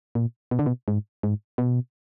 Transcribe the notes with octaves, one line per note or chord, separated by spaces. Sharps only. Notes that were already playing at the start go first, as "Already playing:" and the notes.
A#2
B2
D3
B2
G#2
G#2
B2